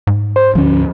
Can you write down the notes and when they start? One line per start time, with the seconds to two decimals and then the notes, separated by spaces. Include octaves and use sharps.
0.07 G#2
0.36 C5
0.55 D2 F3 C#4